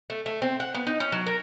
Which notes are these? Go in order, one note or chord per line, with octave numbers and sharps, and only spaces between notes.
A3
A3
C4
F#5
B3
D#4
C#4
F#3
A#4